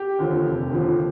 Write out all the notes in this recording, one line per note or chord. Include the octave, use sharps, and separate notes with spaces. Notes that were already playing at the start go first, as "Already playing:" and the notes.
Already playing: G4
D#2 D3 F3
F1
D#2 D3 F3